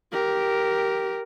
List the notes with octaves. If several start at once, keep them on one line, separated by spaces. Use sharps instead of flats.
G4 A#4